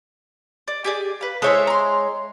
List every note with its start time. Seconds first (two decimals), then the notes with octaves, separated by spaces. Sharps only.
0.68 D5
0.84 G4 G#4 D5
1.21 B4 F5
1.42 G#3 E4 A4 C5 C#5 E5
1.67 A#5 C6